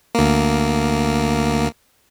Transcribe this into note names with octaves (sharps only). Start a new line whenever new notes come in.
D2 A#3